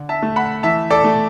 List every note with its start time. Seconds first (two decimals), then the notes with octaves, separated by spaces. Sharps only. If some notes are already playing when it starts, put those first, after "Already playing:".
Already playing: D3
0.09 E5 A5
0.23 A3
0.36 F#5 B5
0.63 E3 E5 A5
0.90 A4 D5
1.04 A3